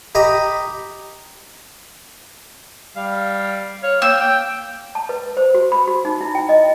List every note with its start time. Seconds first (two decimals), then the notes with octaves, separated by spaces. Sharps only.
0.15 G4 D#5 A#5 B5
2.96 G3 F5
3.83 C#5 F5
4.02 A#3 G5 E6
4.20 A#3 G5
4.95 A5
5.09 B4
5.37 C5
5.54 F#4
5.72 B5
5.88 F#4
6.05 D#4
6.21 E4
6.35 G5
6.49 D#5